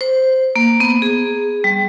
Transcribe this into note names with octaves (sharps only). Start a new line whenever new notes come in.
C5
A#3
B3
G#4
G3